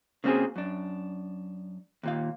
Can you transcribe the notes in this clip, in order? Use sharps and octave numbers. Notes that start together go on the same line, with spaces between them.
C#3 A#3 C4 F#4 G#4
F#2 D4
D#2 A#2 F5